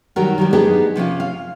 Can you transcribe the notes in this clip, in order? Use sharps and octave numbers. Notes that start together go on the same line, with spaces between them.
D#3 F#3 G3 F#4 A#4
D#3 F#3 G3
B3 D4 D#4 G4 G#4 A#4
C3 F3 C#4 F4
F5